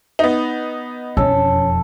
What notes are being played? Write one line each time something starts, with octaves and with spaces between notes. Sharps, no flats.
B3 D#4
E1 F2 C#4 A4